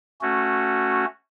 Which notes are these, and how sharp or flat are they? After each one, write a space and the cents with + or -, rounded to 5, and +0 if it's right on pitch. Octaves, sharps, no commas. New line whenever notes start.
A3 +0 C#4 -15 F#4 -5